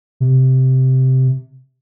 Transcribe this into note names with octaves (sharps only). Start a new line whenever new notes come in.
C3